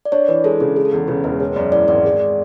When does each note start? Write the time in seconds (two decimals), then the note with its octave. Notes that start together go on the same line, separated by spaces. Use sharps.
0.05 D5
0.12 D4 C#5
0.28 E3 B4
0.44 G#3 A4
0.60 C#3 G#4
0.76 G#3 G#4
0.85 A4
0.92 E2 G#4
1.08 C#3 B4
1.24 E1 B4
1.40 G#3 C#5
1.56 F#2 D5
1.72 E3 D5
1.88 G#1 D5
2.05 G#3